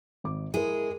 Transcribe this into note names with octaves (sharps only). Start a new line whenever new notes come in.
G#1 D6
G#3 E4 G#4 A#4